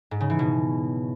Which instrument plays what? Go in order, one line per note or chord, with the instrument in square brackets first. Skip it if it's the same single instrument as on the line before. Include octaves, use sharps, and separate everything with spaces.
[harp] G#2
C#3
E3
B2